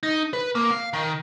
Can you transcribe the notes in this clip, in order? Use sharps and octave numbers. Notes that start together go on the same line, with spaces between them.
D#4
B4
A#3
F5
D#3